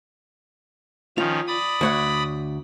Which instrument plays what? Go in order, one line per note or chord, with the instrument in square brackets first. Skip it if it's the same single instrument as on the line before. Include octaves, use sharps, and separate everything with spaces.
[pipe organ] D#3 F3 C#4 [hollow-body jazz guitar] F4
[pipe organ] D5 B5 D#6
[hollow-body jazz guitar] D2 C#5 F#5